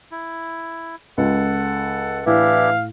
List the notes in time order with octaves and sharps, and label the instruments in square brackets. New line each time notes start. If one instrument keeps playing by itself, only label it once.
[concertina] E4
[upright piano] C#2 [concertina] A4 F#5
[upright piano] A2 [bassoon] E3 [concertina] D4 E4 G4 [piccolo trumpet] F5